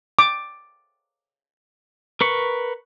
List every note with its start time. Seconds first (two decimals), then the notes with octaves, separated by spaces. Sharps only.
0.19 D6
2.21 A#4 B4 C#6